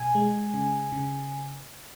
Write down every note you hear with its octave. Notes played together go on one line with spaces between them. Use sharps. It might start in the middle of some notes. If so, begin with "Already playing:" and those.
Already playing: B2 G#5
G#3
C#3
C#3